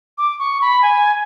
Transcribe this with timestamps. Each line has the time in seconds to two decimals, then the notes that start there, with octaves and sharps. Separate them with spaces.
0.18 D6
0.39 C#6
0.61 B5
0.82 G#5